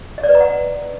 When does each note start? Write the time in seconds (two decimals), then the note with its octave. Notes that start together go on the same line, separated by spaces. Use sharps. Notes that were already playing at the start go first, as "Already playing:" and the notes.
0.18 D#5
0.23 D5
0.29 B4
0.35 A#5
0.40 F#5